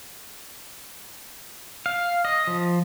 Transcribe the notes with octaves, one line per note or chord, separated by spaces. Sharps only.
F5
D#5
F3